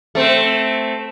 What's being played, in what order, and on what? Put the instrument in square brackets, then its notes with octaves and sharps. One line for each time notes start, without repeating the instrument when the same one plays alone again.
[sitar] A3 C4